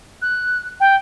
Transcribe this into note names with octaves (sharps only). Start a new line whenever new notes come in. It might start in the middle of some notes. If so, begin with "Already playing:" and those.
F#6
G5